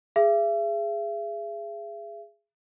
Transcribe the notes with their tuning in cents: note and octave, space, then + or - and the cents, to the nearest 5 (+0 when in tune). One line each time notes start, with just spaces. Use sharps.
G#4 -5 E5 +40